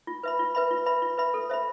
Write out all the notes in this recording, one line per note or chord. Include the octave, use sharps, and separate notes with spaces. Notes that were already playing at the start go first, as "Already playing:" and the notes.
F4
B4 E5 B5
F4
B4 E5 B5
F4
B4 E5 B5
F4
B4 E5 B5
A4
C5 E5 B5